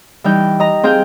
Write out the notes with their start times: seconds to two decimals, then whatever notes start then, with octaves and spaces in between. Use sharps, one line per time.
0.24 E3 G3 D#4 G5
0.60 D#5 A#5
0.83 C4 G#4 F5 G5